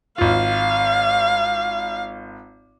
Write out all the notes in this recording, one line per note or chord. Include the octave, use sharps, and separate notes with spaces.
G#1 F4 F5